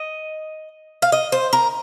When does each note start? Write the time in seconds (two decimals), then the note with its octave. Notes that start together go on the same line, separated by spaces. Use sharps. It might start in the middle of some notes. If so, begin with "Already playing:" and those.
Already playing: D#5
1.02 F5
1.12 D#5
1.32 C5
1.53 A#4